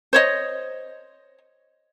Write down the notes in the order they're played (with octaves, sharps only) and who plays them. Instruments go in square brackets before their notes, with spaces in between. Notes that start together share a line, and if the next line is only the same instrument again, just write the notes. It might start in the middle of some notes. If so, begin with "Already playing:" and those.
[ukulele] C5 C#5 D#5